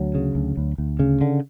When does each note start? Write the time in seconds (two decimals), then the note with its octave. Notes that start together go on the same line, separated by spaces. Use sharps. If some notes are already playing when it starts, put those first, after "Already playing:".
Already playing: D2 F#3
0.15 C#3
0.35 D2
0.57 D2
0.78 D2
0.99 C#3
1.21 D3